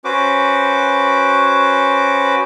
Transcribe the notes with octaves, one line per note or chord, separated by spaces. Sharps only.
C#4 F#4 B4 C5 D6